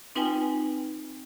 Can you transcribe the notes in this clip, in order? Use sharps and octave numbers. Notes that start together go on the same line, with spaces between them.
C4 D#4 F4 B4 G5 G#5